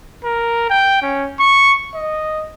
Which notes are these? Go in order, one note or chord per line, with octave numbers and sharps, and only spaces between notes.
A#4
G5
C#4
C#6
D#5